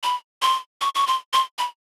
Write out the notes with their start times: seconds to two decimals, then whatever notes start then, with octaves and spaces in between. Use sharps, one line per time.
0.03 B5
0.42 C6
0.81 C#6
0.95 C#6
1.07 C6
1.33 C6
1.58 B5